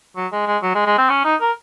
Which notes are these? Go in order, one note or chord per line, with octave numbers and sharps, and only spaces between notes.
F#3
G#3
G#3
F#3
G#3
G#3
C4
C#4
D#4
A#4